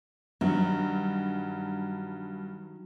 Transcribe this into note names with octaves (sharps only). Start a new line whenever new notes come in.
G2 D#3 F#3